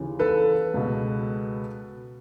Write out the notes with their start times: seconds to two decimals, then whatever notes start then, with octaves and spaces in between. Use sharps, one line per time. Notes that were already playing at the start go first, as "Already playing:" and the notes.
Already playing: D#2 C#3 E3
0.19 A4 B4
0.74 C#2 B2